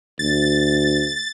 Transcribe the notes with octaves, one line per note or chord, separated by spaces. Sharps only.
D2 A6